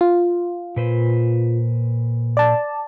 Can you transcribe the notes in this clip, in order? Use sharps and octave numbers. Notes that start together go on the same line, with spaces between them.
F4
A#2 B4 C5
D5 A5